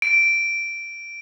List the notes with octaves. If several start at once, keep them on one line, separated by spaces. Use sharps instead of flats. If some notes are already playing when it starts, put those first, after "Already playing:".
D7